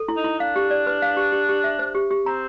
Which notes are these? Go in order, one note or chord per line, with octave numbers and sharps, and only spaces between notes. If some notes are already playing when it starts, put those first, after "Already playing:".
Already playing: A4
E4
D#4
E4
D4 F5
G4
D5
B4
F5
G4
G4
G4
E5
C5
G4
G4
C4 A#5